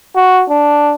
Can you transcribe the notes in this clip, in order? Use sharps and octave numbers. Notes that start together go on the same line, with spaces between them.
F#4
D4